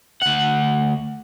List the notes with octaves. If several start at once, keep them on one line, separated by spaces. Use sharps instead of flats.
D2 F#5